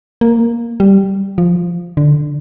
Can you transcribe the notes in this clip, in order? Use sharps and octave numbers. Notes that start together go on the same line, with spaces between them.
A#3
G3
F3
D3